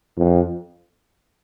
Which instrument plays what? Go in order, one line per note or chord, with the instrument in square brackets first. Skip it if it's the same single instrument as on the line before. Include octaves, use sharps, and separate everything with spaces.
[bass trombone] F2